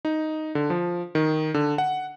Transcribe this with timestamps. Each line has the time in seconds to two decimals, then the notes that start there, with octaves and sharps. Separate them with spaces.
0.05 D#4
0.55 D3
0.70 F3
1.15 D#3
1.54 D3
1.78 F#5